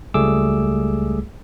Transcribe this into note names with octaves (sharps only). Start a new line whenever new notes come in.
C#2 G3 A3 G#4 D6 E6